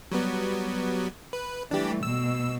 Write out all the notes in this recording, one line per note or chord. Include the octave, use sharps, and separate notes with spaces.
F#3 G3 B3
B4
E3 G3 A3 D4 G4
B2 E6